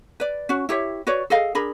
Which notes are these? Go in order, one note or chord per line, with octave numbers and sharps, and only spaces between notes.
B4 D5
C#4 F#4
E4 G4 C#5 E5
F#4 B4 C#5 D5
G#4 A4 D#5 F5
D4 G#4 A#4 B5